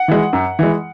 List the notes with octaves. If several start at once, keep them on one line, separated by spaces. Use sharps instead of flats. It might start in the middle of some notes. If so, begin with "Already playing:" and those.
Already playing: F#5
E3 G#3
F#2
E3 G#3